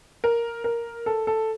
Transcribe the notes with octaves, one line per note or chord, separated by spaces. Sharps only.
A#4
A#4
A4
A4